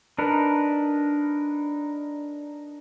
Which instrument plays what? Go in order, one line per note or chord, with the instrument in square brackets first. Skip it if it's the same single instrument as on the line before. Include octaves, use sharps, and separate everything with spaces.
[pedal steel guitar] D4 D#4 A#4 B4